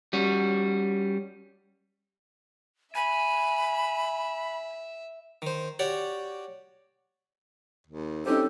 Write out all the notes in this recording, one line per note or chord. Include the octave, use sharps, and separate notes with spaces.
G3 C#4 F#4
E5 G#5 B5
D#3 C5
F#4 G4 C#5 D5
D#2
C4 C#4 D#4 G4 A4